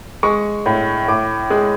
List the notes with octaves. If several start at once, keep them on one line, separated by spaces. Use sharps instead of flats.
G#3 C#6
A2
A2 D6
G#3